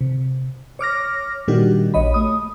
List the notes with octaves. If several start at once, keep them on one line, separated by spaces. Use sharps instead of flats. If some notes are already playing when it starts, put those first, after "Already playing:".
C3
C#5 D6 F6 A#6
A#2 D#3 G3 D4 F#4 G4
A#1 C#5 D#5 B5
A3 D#6